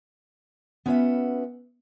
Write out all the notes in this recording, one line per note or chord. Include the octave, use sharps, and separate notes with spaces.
B3 C#4 F4 B4 E5 F#5